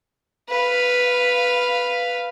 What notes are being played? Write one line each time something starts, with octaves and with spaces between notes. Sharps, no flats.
B4 F5